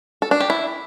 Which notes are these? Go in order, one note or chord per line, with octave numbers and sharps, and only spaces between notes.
A4
D4
G4
E4